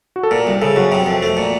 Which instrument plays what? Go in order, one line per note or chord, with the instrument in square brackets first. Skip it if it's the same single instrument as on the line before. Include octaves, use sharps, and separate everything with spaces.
[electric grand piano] F#4
A4
[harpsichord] A#2 [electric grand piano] A#4
[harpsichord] C2
[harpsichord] C#3 [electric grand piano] A4
[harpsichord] F#2 [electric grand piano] F#4
[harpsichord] C3
F2
A3
A#2